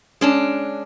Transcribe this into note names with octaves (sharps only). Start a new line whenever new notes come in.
G#3 C#4 D4